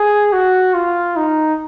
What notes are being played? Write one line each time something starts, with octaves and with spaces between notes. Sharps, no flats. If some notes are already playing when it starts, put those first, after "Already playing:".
Already playing: G#4
F#4
F4
D#4